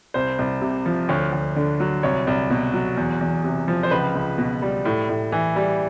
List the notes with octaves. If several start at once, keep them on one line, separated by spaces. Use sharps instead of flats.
C2 C5
C2
C3
F3
D2 C#5
D2
D3
F#3
C2 C#5
C2
B2
F#3
E2
E2
C3
F3
C5
C#2 B4
C#2
B2
G3
A2
A2
E3
G3